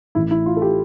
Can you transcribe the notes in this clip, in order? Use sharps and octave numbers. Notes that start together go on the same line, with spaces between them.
A1 A2 E3 A3 E4
E4
F4
A4
G4